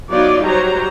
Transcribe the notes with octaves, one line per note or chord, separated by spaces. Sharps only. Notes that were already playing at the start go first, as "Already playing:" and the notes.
F#3 B3 D#4 F4 D5
F#3 G3 C5 A#5